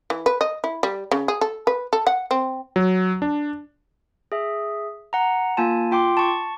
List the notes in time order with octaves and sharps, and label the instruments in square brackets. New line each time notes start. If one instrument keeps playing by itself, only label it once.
[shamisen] E3
B4
D#5
E4
G3
C#3
G#4
A4
B4
A4
F#5
C4
[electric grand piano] F#3
D4
[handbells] G#4 E5
F#5 A#5
A#3 F4 G#5 A5
F4 G5 C6 D6
A5 C#6